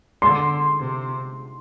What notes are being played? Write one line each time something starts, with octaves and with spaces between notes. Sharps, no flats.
D3 C6
C3